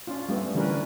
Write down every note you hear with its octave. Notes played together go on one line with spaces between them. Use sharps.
C#4 D4 F4
G3 A3 B3
D3 E3 G3 C#4 A#4 B4
D4